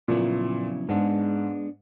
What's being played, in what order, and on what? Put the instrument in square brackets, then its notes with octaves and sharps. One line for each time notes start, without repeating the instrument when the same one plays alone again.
[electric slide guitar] F2 C#3 F#3 B3 E4 [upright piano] A#2
[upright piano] G#2 [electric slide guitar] G#3 B3 D4